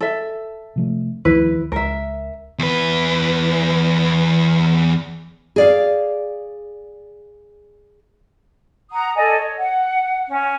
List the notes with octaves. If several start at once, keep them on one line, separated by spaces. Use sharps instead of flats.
A4 E5
C3 F3 A3
D2 D#3 F3 E4 B4
C#2 A#4 E5
E2 B4
G#4 D5 F5
F#5 A#5 D#6
A4 D5 D#5 G#5
C#5
F#5
C#4